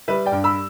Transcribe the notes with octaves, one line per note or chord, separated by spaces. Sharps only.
G3 B4 E5
D5 G5
G2
B5 E6